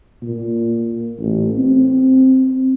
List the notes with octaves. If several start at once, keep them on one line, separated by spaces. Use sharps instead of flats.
A#2
A1
C4